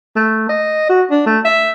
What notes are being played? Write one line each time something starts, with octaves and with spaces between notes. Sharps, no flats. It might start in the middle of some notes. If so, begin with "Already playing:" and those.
A3
D#5
F#4
D4
A3
E5